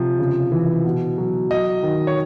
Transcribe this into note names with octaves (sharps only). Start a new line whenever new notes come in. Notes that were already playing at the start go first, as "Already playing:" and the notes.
Already playing: C3 F3
C#3
E3
B2
F#3
F#3 D#5
D#3
C#5